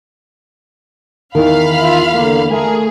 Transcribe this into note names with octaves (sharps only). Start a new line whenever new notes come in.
E2 D#3 A#4 F5 B5 F6
F4 E5
D3 A#3
A3 G#4 A#4